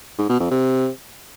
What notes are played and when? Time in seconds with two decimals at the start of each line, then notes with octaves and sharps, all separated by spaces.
0.18 G#2
0.29 B2
0.40 F2
0.51 C3